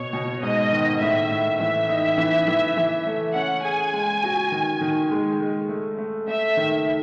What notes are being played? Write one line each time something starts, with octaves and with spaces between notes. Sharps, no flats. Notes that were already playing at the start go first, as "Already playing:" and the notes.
Already playing: B2 C#5
B2
G#2 D#5
D#3
A2 E5
A2
E3 E5
D#4
E3
E3
E3
A3
C#4 F#5
G#4 G#5
G#3
F#4
D#3
D#3
G#3
G#3
A3
A3
A3 E5
D#3